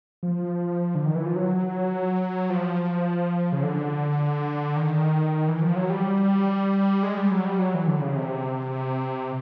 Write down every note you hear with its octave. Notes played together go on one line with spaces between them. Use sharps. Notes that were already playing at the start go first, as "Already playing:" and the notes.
F3
D3
D#3
E3
F3
F#3
F3
C#3
D3
D#3
E3
F3
F#3
G3
G#3
G3
F#3
G3
F#3
E3
D3
C#3
C3